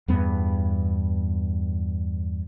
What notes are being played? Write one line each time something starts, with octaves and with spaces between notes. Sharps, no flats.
E2 G2 B3